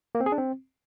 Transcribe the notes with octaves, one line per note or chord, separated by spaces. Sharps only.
A#3
C4
G#4
D4
C4